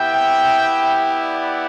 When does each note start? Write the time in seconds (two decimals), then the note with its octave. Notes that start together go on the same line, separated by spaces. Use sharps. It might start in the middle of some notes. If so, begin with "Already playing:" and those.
Already playing: B3 E4 G4 E5 G5
1.21 D5 F#5